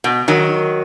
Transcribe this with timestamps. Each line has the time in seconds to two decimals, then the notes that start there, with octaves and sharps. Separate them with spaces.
0.04 B2
0.28 D#3 F#3